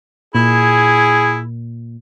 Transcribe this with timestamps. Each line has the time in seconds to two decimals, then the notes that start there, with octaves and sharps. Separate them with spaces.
0.35 A#2 E4 G#4